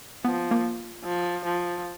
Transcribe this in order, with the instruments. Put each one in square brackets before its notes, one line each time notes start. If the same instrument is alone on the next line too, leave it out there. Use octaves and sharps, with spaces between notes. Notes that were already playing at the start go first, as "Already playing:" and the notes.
[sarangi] F3 [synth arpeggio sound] B3
[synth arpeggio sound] A#3
[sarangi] F3
F3